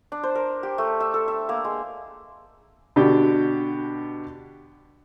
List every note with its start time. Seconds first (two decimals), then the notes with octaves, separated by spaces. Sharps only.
0.12 D4
0.23 C5
0.35 A#4
0.63 G4
0.78 A3
1.00 E5
1.14 A4
1.28 E5
1.49 A#3
1.64 G#3
2.96 B2 D3 D4 G4